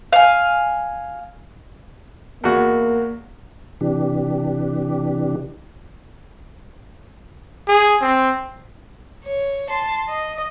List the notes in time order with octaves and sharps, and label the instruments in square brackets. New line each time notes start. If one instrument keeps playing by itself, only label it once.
[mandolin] F5 G#5
[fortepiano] E2 F#4 [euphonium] A#3
[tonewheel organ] C3 E3 D4 G4
[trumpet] G#4
C4
[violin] C#5
A5 C6
D#5